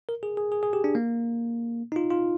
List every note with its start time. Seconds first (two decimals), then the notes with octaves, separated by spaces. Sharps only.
0.09 A#4
0.23 G#4
0.37 G#4
0.52 G#4
0.63 G#4
0.73 G4
0.84 D4
0.95 A#3
1.92 D#4
1.96 F4
2.11 F4